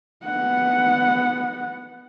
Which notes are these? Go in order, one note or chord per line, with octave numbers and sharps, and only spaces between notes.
B3 F#5